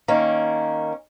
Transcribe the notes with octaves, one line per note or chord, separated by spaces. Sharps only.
D#3 A#3 C#4